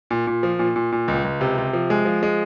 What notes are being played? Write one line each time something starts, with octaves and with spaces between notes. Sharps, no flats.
A#2
A#2
F3
A#2
A#2
A#2
C#2
C#2
C3
C3
F3
G#3
F3
G#3